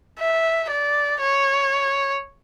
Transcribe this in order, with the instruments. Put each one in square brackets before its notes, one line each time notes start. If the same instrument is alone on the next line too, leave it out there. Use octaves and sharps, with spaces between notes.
[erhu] E5
D5
C#5